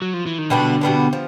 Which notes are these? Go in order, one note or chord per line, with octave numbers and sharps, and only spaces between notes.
F#3
F3
E3
D#3
B2 D3 G3 B3 D4
B2 G3 B3 D4
F3